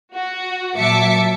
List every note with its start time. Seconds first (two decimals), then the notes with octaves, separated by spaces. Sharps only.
0.14 F#4
0.77 A#2 F#3 E5 A5 D6 C#7